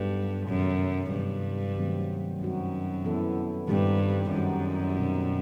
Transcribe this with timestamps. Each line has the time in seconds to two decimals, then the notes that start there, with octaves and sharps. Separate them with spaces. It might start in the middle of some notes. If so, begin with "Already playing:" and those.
Already playing: G2 F#3 B3 D#4 F#4 A4
0.48 F#2 C3 D#3 F#3
1.12 G2 C3 E3 B3
1.76 D#3 F#3 A3 C4
2.40 F#2 G3 C4 D#4 F#4
3.04 E3 B3 E4 A4
3.68 G2 D#3 G3 C4 D#4 G4
4.32 F#2 D#3 G3 D#4 F#4
4.96 B2 G3 C4 D#4